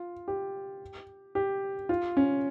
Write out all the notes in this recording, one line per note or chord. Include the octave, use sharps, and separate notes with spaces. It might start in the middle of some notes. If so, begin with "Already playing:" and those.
Already playing: F4
G4
G4
F4
C#4